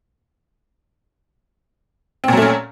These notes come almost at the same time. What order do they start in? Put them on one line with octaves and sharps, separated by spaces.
C4 A#2 F#3 A3 C#4